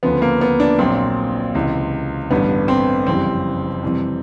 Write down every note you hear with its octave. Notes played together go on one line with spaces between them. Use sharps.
D2 C#3 F3 B3
A#3
B3
D4
A#1 A#2 F#3 C4
C#2 C3 E3
A1 G2 D3 G3 B3
C4
F#1 F2 C#3 E3 G3 C4
F2 C3 E3 G3